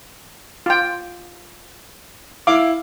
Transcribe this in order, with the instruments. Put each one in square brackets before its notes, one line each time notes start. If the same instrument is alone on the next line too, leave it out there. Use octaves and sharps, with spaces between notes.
[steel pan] F4 G5
[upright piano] E4 F5 [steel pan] D6